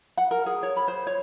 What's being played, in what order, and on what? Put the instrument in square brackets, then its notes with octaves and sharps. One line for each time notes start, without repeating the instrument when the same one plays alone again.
[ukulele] F#5
A#4
G#4
C#5
B5
C5
C#5